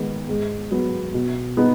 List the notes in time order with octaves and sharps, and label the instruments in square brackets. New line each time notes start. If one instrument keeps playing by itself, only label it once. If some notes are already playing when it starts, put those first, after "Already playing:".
Already playing: [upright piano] D#3 G#3 B3
G#2
F#3 B3
B2
B3 D#4